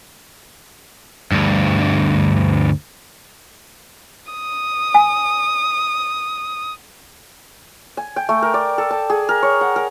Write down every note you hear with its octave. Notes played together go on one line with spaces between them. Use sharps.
D2 G2
D#6
G#5
G#5
G5
A3
A#4
D5
A4
A5
G#4
A#4
C#5
F#5
A#4